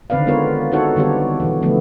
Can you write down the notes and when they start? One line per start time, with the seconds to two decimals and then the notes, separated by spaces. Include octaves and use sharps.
0.10 D3 D#3 C4 B4 D5 F5
0.27 G#3 B3 F4 A#4 B4 C#5
0.72 C4 D#4 F#4 A4 C#5 F#5
0.96 D3 D#3 G3 B3 G4 C#5
1.40 B2 E3
1.62 D3 F3 A3 B3